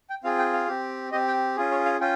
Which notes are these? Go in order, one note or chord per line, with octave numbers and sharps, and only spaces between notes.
G5
C4 F4 G#4 F5
G5
F5
C4 G4
C4 G4 D#5
G5
C#4 F4 G#4
C#5
F5
C#4 F4 G5